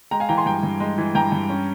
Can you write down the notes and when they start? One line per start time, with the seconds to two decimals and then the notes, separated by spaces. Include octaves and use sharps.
0.11 G#3 G5 A#5
0.20 F5 G#5
0.29 E3 G5 A#5
0.38 G#5 C6
0.46 G2 G5 A#5
0.63 G2
0.80 G#3
0.98 E3
1.15 G2 G5 A#5
1.32 G2
1.49 C#4